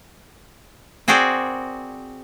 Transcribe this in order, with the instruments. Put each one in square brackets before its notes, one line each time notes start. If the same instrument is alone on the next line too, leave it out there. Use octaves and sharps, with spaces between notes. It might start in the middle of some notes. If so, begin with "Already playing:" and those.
[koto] C4 F#4 G#4 A#4 C5 D5